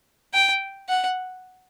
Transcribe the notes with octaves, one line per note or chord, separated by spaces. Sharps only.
G5
F#5